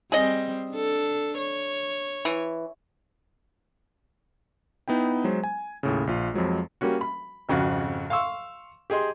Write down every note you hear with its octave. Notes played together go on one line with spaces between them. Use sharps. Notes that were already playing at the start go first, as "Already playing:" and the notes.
G3 C4 G#4 D#5
D4 A4
C#5
E3
B3 D#4 E4 G5
F#3 G#3 C5
G#5
D#2 A2 C#3
A#1 F4
F2 F3 F#3 G#3
G3 A#3 C#4 F#4
B5
G#1 F2 C#3 F#4 F#5
F5 C6 C#6 E6
G4 G#4 D#5 C6